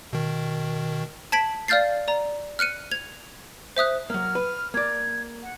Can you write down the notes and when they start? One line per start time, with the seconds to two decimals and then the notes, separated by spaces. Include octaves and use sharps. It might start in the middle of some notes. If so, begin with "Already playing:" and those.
0.13 B2 D#3
1.32 A5 G#6 B6 D7 F#7
1.68 D5 F5 F6 G6 A6 C7
2.08 D5 A#5
2.59 F6 F#6 C#7 D#7
2.92 G#6 F7
3.77 C5 E5 D#6 F#6
4.10 F#3 A#3 F6
4.35 B4
4.74 A#3 D5 G#6
5.42 F#5